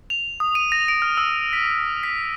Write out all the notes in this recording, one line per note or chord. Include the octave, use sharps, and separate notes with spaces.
F7
D#6
D#7
A#6
D7
F6
E6
B6
B6